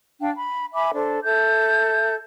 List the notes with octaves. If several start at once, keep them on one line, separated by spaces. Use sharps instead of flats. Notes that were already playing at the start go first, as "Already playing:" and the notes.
D4 F5 G5
B5
E5 G#5 B5 D6
D4 A4 C5
A4 E5 G6